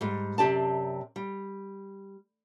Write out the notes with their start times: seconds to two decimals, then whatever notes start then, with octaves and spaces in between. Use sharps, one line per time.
0.01 G#2 G3
0.38 F#2 C3 G4 D5 A5
1.16 G3